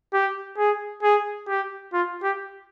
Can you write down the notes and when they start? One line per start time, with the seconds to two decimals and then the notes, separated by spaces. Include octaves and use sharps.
0.13 G4
0.58 G#4
1.03 G#4
1.48 G4
1.93 F4
2.23 G4